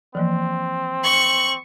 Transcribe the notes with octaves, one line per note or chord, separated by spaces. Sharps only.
E3 F3 A#3 C4
C#6 F#7